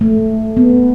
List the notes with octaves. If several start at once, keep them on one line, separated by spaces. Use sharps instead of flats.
A3
B3